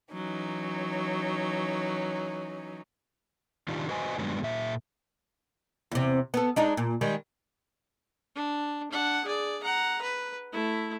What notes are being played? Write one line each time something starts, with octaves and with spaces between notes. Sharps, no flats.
E3 F#3 C#4 D#4
D#3 D4 D#4 F4 G4
F#4 B4 C5 D#5 G#5
G2 D#3 F#3 G#3 B3 D4
A#2 E5
E2 C3
B3 A4
G#3 D4 D#4
A#2
D#3 G3 G#3
D4
D4 F#5
G#4 D5
F#5 A#5
B4
A3 E4